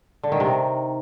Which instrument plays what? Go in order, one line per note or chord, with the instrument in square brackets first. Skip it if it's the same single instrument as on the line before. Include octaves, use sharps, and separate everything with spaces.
[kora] D3
D#3
C3